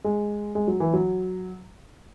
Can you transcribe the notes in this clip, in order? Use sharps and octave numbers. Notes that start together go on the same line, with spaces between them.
G#3
G#3
F#3
E3
F#3